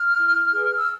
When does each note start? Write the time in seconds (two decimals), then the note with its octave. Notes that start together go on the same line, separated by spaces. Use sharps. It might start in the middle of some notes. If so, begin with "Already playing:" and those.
Already playing: F6
0.18 E4
0.53 G#4 B4
0.79 E6